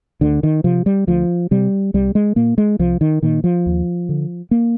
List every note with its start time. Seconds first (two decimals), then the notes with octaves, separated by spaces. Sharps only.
0.21 D2 D3
0.43 D#3
0.64 C3 F3
0.86 G3
1.07 D2 F3
1.51 C3 G3
1.94 C2 G3
2.15 G#3
2.36 A#2 A#3
2.58 G#3
2.79 C2 F3
3.01 D#3
3.23 A#2 D#3
3.44 F3
3.66 D#2
4.09 D3
4.51 A#3